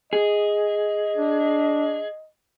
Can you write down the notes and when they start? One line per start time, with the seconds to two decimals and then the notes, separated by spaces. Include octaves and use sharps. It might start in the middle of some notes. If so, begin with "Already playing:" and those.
0.13 G#4 D#5
1.17 D4